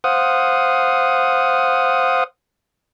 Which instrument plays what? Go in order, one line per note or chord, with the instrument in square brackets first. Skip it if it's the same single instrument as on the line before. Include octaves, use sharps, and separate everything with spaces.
[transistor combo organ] C5 F5 F#5 D#6